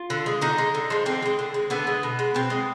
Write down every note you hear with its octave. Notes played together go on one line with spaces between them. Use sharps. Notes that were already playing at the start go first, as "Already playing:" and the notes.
Already playing: F4
D3
G#3
D3 D#4
G#3
D3
F3 G#3
D3 C4
F3
G#3
D3
G#3
D3 B3
G#3
B2
G#3
B2 C4
G#3